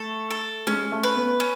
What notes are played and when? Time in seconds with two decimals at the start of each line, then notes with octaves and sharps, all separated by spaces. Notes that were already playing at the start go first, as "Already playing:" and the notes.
Already playing: A3 A4
0.31 A4
0.67 G#3 C#4
0.92 A3
1.03 B4
1.16 B3
1.40 C#4